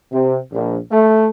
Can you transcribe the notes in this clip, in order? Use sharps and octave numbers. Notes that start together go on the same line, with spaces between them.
C3
A#1
A3